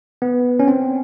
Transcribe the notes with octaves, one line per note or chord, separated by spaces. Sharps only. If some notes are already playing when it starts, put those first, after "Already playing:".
B3
C#4
C4